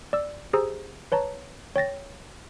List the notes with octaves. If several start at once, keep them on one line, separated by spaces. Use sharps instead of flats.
D5 E6
G4 G#4 C5 A#5 D#6 E6
B4 C#5 A5 A#5
C#5 G5 A6 A#6